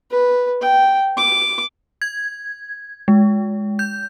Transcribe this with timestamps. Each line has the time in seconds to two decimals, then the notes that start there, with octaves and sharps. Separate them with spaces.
0.11 B4
0.61 G5
1.17 D6
2.02 G#6
3.08 G#3
3.79 G6